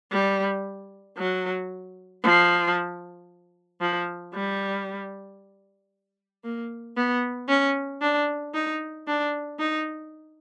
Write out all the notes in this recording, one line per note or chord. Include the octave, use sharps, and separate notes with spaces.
G3
F#3
F3
F3
G3
A#3
B3
C#4
D4
D#4
D4
D#4